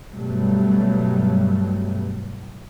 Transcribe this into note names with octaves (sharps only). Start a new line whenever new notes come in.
G2 B2 F#3 G3 A3